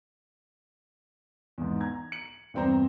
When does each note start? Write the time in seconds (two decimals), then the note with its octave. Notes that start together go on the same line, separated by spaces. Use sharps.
1.58 E2 G#2
1.80 A#5 G#6
2.12 C#7 F#7
2.54 E2 G2 C4 C5 A#5